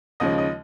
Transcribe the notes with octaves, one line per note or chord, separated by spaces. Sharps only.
D#2 C#3 F3 G#3 C#4 D#5
D#5